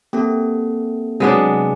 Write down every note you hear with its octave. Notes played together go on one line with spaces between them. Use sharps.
A#3 C4 G4 A4
C3 F#3 G#3 B3 D4